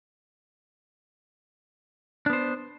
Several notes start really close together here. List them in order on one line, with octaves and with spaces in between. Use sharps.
D4 B3 C5